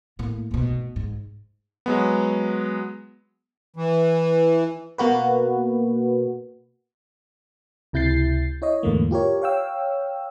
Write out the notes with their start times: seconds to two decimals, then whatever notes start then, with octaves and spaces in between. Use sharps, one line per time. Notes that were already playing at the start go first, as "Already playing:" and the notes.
0.19 A2 A#3
0.51 F1 B2
0.96 G#2
1.86 F#3 G#3 B3
3.76 E3
4.98 B2 A#3 F#4 B4
7.93 C#2 C3 E4 G6 A6 C7
8.62 E4 C#5 D#5
8.83 E2 G#2 D3 E3 A3 A#3
9.11 F4 G4 A#4 C#5
9.42 C#5 F5 G5 E6